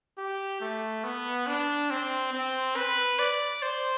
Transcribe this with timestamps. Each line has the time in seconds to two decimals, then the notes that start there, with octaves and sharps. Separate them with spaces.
0.18 G4
0.61 A3
1.04 B3
1.47 D4
1.90 C4
2.33 C4
2.76 B4
3.19 D5
3.62 C5